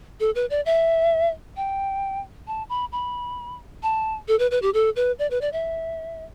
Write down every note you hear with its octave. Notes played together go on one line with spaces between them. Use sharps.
A4
B4
D5
E5
G5
A5
B5
B5
A5
A4
B4
B4
G4
A4
B4
D5
B4
D5
E5